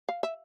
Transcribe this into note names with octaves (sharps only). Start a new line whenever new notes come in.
F5
E5